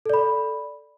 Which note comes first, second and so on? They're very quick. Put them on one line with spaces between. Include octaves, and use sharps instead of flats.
A4 D5 B5